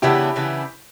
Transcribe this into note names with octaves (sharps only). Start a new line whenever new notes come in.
C#3 E3 B3 D4 E4 G4
C#3 E3 B3 D4